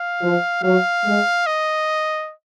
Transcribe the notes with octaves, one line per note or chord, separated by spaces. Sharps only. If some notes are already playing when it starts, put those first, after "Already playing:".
Already playing: F5
F3
F#3 F5
G#3
D#5